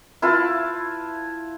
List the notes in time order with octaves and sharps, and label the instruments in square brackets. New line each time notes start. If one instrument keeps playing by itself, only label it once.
[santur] E4 F4 B4 A5